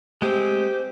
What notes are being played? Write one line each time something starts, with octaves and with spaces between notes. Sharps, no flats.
G#3 A3 C4 G4 C5